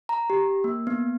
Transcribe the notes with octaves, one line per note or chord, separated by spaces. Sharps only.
A#5
G4
A#3
B3